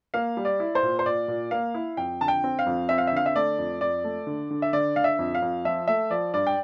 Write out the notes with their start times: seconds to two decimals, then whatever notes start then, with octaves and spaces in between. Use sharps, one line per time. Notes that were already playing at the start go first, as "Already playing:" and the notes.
0.14 A#3 F5
0.37 G3
0.45 D5
0.60 E4
0.75 C5
0.83 A#2
0.99 C5
1.06 A#2 D5
1.28 A#2
1.51 A#3 F5
1.74 E4
1.97 F2 G5
2.21 D3 A5
2.28 G5
2.44 C4
2.59 F5
2.66 F2
2.89 C4 E5
2.98 F5
3.07 E5
3.12 D3 F5
3.26 E5
3.35 A3 D5
3.58 F2
3.81 F2 D5
4.04 A3
4.27 D3
4.51 D3
4.62 E5
4.73 D3 D5
4.96 D3 F5
5.04 E5
5.19 F2
5.35 F5
5.42 F2
5.65 F3 E5
5.87 A3 E5
6.10 F3 D5
6.34 G2 D5
6.47 G5